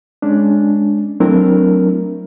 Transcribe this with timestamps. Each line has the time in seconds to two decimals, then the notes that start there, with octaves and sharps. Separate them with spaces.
0.22 G#3 C#4 D4
1.20 F#3 A3 C4 D4 E4 A#4